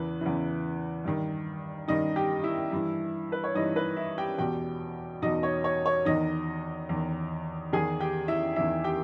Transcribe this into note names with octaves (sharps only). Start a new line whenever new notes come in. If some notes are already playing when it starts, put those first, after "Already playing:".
Already playing: E2 C#3 E3 B4
E2 C#3 E3
G2 D#3
G2 D#3 D#4 D#5
G4 G5
E4 E5
G2 E3
B4
C#5
G2 E3 D#4 D#5
B4
E4 E5
G4 G5
E2 B2 G4 G5
E2 B2 D#4 D#5
C#5
C#5
C#5
E2 D#3 D#4 D#5
E2 D#3
E2 D#3 G#4 G#5
G4 G5
E4 E5
E2 D#3 E4 E5
G4 G5